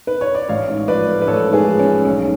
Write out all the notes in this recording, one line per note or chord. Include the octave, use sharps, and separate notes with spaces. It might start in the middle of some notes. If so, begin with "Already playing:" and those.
B4
C#5
D5
A1 C#5 F5
G#2
F3 B4 D5
A3
B4
A1 A4 C#5
G#2
G#4 B4
F3
C#4
A3
B1 C#4